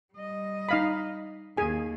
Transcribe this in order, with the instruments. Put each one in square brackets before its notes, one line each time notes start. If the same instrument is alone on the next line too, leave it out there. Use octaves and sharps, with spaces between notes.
[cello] G3 D#5
[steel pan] D#4 F5 B5
[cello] D#2 [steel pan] G#4 G#5